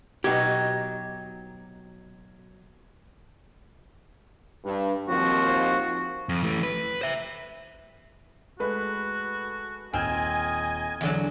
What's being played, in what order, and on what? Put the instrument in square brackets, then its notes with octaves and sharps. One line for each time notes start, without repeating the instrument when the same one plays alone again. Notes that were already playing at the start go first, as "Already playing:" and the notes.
[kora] B2 F#4 F#5 [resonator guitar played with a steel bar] F#3 D#4 [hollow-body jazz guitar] G4 [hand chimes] G#6
[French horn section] G2
[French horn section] D#2 F3 C4 [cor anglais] F#4
[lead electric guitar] F2
E3 A3
B4
C5 E5
[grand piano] G#3 A3 B4 [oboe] F#4
[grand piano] D#1 F6 G6 [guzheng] C4 [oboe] D#5 [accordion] G#5
[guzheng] E2 D3 F#3